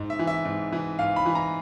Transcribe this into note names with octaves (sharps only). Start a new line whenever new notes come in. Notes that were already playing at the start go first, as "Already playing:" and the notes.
Already playing: G#2
E5
E3
E5
G#2
E3
G#2 F5
B5
E3
A#5